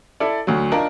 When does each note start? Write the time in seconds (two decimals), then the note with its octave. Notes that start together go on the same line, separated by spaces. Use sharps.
0.20 E4 A4 D5
0.47 D2 F#3
0.72 D4 D#4 F4 A#4